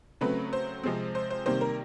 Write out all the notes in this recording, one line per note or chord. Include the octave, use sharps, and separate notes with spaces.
C#3 F#3 A3 C4 B4
C5
C3 F3 G#3 C4
C5
C5
C3 D#3 G3 A#3 C5
A#4